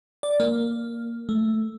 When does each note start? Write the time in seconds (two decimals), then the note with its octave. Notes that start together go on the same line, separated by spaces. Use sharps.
0.23 D5
0.40 A#3
1.29 A3